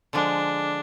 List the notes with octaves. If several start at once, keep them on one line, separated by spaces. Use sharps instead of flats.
D3 F3 G#3 D4